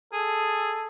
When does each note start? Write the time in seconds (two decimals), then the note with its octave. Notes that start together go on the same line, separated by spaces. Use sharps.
0.13 G#4 A4